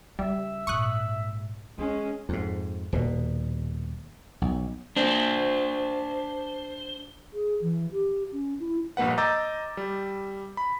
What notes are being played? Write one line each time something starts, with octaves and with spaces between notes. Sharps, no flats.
C#3 G3 E5
A#1 G#2 C#6 D#6 F#6
G#3 B3 C#4
F2 G#2
D#1 B2
B1
D4 C5
G#4
E3
G4
C#4
E4
A#1 G2 A#3 B4 F#5
D#5 A#5 D6 E6 G6 A6
G3
B5